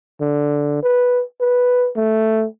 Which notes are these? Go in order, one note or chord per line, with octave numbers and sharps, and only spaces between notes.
D3
B4
B4
A3